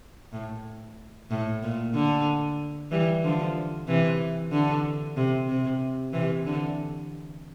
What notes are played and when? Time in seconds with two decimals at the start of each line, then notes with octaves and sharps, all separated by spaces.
0.33 A2
1.30 A2
1.63 A#2
1.94 D3
2.91 E3 G3
3.23 D3 F3
3.87 C3 E3
4.52 D3
5.16 C3
5.48 C3
6.13 C3 E3
6.46 D3